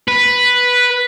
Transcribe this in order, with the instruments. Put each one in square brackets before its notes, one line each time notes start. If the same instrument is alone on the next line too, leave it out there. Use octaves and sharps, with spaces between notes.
[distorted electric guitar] B4